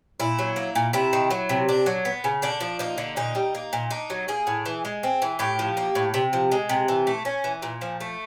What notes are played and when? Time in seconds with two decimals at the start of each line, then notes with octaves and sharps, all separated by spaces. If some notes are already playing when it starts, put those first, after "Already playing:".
0.20 A#2 E4
0.39 F#3
0.56 A#3
0.75 A#2
0.93 C3 E4
1.13 D#3
1.31 F#3
1.49 C3
1.69 D4
1.86 F#3
2.05 B3
2.24 C#3
2.42 D3 D4
2.60 F3
2.79 A#3 D#4
2.98 D3
3.16 A#2 D#4
3.35 G3
3.55 A#3
3.73 A#2
3.90 D4 D#4
4.10 F#3
4.28 A#3 G#4
4.47 A2
4.66 E3
4.85 G#3
5.03 C4
5.22 E3
5.39 A2 G4
5.59 F3
5.77 A#3
5.95 A2
6.14 C3
6.33 F3
6.52 G#3
6.69 C3
6.88 E3
7.07 A3
7.25 C#4
7.44 E3
7.62 A#2
7.81 F3
8.00 A3